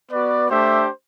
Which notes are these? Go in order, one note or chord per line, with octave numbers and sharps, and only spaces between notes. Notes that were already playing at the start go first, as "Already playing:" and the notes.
B3 F#4 B4 D5
A3 D4 G4 C5 E5